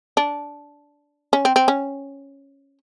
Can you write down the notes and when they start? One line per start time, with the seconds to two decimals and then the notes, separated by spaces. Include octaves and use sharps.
0.17 D4
1.33 C#4
1.45 C4
1.56 C4
1.68 C#4